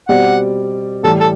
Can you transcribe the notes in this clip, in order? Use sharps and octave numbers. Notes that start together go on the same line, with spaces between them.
B2 G3 C4 G4 D5 F#5
A2 E3 G3 A4
A4